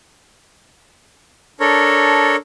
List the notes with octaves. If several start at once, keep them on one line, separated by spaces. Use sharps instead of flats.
D4 A4 A#4 C#5